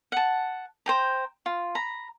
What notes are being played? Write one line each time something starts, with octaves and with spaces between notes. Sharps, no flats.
F#5 A5
C5 G5 A#5
F4
A#5 B5